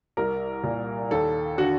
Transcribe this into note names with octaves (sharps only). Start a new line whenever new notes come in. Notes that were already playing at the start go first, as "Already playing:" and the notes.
C2 A#4
A#2
D#2 A4
D3 F#4